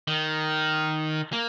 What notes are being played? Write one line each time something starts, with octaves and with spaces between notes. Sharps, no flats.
D#3
A#3